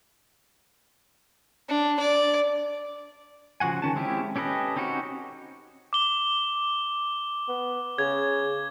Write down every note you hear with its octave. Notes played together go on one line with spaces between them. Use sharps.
D4
D5
C#3 F3 F#4 F#5 G#5
D#3 C#4 A5
G#3 C4 C#4 E4 G4
C#4 G4 A4 B4 D#5
C4 C#4 D#4 F#4 G4
D6 G7
B3
C#3 G#6